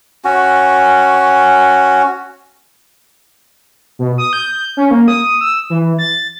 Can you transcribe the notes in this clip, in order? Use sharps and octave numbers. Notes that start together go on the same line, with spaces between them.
C#4 F#4
B2
D#6
G6
C#4
A#3
D#6
E6
E3
A6